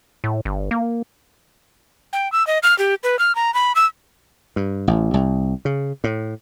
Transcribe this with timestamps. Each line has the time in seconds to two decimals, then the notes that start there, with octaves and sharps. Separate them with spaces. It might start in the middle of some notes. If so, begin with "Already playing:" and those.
0.24 A2
0.45 G1
0.71 A#3
2.13 G5
2.32 E6
2.47 D#5
2.63 F6
2.78 G4
3.04 B4
3.19 F6
3.35 A#5
3.54 B5
3.75 E6
4.56 G2
4.87 A1
5.14 C2
5.65 C#3
6.04 A2